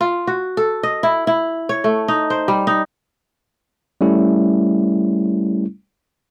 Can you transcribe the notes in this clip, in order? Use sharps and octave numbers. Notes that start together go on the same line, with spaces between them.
F4
F#4
A4
D#5
E4
E4
C#5
A3
D#4
C5
G3
D#4
G3 A3 C#4 E4